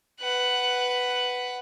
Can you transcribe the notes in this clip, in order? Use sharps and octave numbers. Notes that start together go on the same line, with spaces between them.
B4 F#5